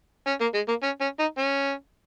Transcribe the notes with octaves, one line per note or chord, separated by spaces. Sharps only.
C#4
A#3
G#3
A#3
C#4
C#4
D#4
C#4